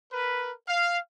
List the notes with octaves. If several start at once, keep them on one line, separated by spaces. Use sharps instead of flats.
A#4 B4
F5